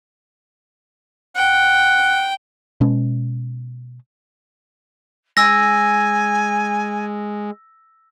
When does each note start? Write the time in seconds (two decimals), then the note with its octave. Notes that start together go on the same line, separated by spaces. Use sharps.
1.36 F#5 G5
2.81 B2 G#3 C#4
5.37 G#3 G#5 E6 A#6